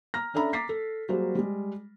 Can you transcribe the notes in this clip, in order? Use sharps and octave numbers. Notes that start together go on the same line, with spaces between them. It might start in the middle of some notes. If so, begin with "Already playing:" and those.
A#5 F6 A#6
C#4 D4 A4 E5 A#5 B5
A#5 D6 A6 B6 C7
A4
F#3 G3 A#3 F#4 G#4 C5
G3 G#3